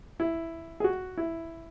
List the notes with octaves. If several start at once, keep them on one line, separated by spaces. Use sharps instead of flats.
E4
G#4
F#4
E4